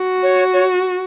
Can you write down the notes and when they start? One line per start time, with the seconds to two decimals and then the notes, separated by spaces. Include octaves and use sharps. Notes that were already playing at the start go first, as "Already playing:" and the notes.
Already playing: F#4
0.23 C#5
0.53 C#5